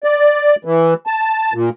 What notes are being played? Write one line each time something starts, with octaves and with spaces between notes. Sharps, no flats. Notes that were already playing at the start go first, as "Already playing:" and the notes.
D5
E3
A5
A#2